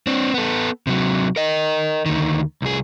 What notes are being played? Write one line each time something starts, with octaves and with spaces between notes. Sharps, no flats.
C4 D4
B3 A4
C3 F#3
A#4 D#5
D2 D#3
C2 G#4